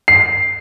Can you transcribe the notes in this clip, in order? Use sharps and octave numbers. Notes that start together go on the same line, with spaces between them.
C7